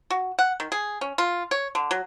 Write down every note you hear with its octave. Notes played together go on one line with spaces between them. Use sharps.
F#4
F#5
D#3
G#4
C#4
F4
C#5
D3
F#3